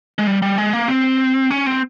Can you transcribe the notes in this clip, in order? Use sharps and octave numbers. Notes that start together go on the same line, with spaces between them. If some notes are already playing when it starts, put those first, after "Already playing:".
G#3
G3
G3
G#3
A#3
C4
C#4
C4